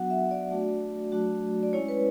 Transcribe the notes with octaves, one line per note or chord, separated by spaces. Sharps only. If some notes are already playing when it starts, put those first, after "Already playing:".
Already playing: F#3 B3 D4 F#4 F#5
E5
D5
A3 D4 F#4
F#3 A3 D4 F#4
D5
G#3 C#4 E4 C#5
B4